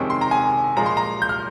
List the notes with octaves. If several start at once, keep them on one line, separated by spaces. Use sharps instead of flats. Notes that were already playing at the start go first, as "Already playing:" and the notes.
Already playing: F2 C3 D#3 G#3 C#4 G5
C6
A#5
G#5
A#2 F3 G#3 A#5
C6
A#5
G6
F6